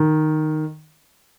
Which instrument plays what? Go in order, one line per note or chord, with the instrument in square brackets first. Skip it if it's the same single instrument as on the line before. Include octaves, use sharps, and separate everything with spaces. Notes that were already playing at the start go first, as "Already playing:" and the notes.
Already playing: [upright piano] D#3